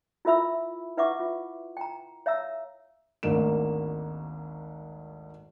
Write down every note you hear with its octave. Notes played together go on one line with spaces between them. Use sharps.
E4 F4 A#4 E5 B5 E6
E4 B4 E5 F#5 C#6 D6
F4
G5 A#5
C#5 E5 F5 A#5 E6
G#1 D2 G#2 D#3 A#3 E7